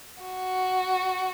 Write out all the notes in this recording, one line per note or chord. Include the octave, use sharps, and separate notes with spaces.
F#4